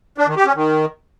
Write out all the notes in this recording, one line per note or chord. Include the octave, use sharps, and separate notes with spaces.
D4
D#3
G4
C#4
D#3